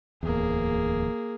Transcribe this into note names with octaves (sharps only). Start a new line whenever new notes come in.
D1 E2 A#3 G#4